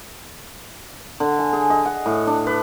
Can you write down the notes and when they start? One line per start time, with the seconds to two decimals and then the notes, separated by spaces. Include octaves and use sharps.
1.20 D3
1.39 G#5
1.53 G#4
1.70 D#5
1.85 F#5
2.06 A2
2.27 D4
2.47 B4